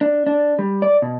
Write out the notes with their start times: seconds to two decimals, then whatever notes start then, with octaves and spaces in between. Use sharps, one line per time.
0.01 D4
0.27 D4
0.59 G3
0.82 D5
1.02 B2